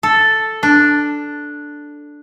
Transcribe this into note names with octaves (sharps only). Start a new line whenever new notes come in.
A4
D4